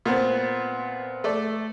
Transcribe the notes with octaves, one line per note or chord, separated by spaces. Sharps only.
A#2 B3 C4
A3 A4 D5